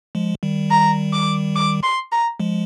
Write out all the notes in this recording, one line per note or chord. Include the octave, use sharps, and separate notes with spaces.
F3 G#3
D#3 G3
A#5
D6
D6
C6
A#5
F3 G#3